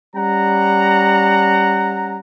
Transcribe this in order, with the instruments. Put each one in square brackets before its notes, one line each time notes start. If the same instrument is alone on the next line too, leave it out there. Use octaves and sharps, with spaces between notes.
[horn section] G3 C#4 F#5 A#5